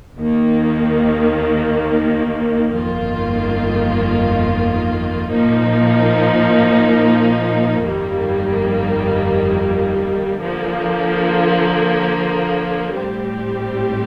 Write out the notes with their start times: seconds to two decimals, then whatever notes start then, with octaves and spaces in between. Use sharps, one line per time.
0.19 D#2 D#3 A#3
2.75 G1 F2 D#3 A#3 F4
5.30 A#2 F3 A#3 D#4
7.86 G1 F2 D#3 G3 A#3
10.40 D3 F3 A#3
12.96 A2 G3 C4 G4